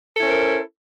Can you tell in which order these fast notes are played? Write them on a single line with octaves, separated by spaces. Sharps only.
A4 E4 C#4 C5 A#4